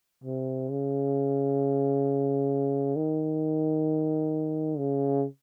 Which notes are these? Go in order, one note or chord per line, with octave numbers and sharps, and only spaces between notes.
C3
C#3
D#3
C#3